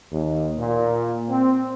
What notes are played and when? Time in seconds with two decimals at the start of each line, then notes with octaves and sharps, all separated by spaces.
0.13 D#2
0.58 A#2
1.30 C4